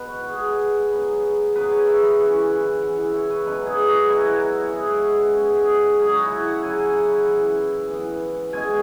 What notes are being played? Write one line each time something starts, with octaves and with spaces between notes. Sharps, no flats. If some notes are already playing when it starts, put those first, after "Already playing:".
Already playing: B2 B3 B4
F#4
B2 B3 G#4
C#3 F#3 B3
C#3 F#3 B3 B4
C#5
E5
B5
E3 C#4 C#6
B5
E3 C#4 F#5
E5
C#5
B4
B2 F#3 C#4 B4
G#4
F#4
B2 F#3 C#4 E4
F#4
E4
F#4
C#3 G#3 B3 G#4
F#4
F#4
F#4
C#3 G#3 B3
G#4
F#4
C#3 F#3 C#4 G#4
F#4
E4
F#4
F#5
C#3 F#3 C#4 G#5
G#5
F#5
B5
E3 B3
E3 B3
B2 G#3 C#4 G#5